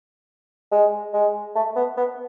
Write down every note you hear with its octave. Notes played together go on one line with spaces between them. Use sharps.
G#3
G#3
A3
B3
B3